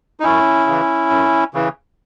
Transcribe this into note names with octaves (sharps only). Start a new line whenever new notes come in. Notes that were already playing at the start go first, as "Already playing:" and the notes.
D#4
F#2 C#4 E4
C#3 E3
F#2
C#3 E3